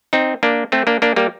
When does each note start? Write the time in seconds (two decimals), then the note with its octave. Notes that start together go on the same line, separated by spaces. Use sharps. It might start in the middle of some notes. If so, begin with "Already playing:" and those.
0.13 C4 D#4
0.43 A#3 D4
0.72 A3 C4
0.87 A#3 D4
1.02 A#3 D4
1.16 G3 A#3